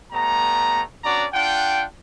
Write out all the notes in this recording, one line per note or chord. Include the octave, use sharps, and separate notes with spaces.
G3 A3 B3 A#5
B3 C#4 D4 F#4 D5 A#5
D4 F4 F#5 G5